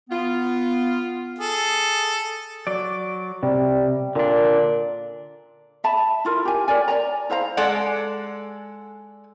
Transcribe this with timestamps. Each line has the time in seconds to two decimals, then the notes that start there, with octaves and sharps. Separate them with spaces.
0.10 B3 F4
1.39 G#4 A4
2.67 F#3 D5
3.43 C3 G3
4.15 A#2 D3 D4
5.84 E5 A5 B5
6.25 E4 F4 A#4
6.45 G4 G#5
6.68 A#4 C#5 D5 G#5
6.88 D5 G#5 A#5
7.30 E4 C5 F5 A#5
7.57 G#3 A4 D5 F#5